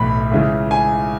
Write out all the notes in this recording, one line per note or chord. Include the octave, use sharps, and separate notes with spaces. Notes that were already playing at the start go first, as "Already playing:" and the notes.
Already playing: B1 A2 E3 B5
C#2 C#3 E3
G#5